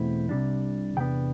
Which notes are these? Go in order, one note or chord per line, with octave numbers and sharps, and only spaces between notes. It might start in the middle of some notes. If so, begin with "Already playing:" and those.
Already playing: E2 B2 A3 C4 E4
C2 C3 G3 D4
E2 C3 B3 D4 G5